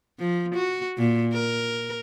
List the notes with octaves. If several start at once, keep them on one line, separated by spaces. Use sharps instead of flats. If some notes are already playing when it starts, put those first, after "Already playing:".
F3
F#4
A#2
A#4